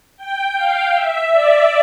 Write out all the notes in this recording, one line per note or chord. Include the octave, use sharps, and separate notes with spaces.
G5
F5
E5
D5